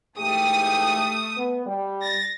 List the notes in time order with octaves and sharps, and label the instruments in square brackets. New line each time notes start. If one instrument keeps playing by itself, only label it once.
[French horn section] G#2 E3 G4 [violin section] A3 D#6
[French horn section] B3
G3
[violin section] A6 A#6